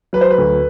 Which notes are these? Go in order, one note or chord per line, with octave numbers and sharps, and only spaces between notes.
F#3 B4
C5
B4
D2